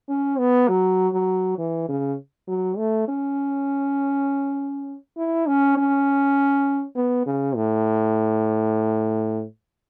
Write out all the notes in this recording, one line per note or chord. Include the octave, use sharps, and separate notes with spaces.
C#4
B3
F#3
F#3
E3
C#3
F#3
A3
C#4
E4
C#4
C#4
B3
C#3
A2